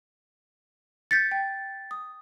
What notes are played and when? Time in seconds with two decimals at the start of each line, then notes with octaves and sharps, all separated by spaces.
1.11 G6 A6 B6 C#7
1.31 G5
1.91 D#6